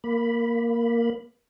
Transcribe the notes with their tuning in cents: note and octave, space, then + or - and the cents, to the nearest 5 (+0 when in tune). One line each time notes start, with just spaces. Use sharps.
A#3 +0 B5 +0